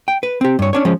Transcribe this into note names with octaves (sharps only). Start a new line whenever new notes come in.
G5
B4
C4 G4
G2 C#5
C#4 D4 C#5
F3 G#3 C#4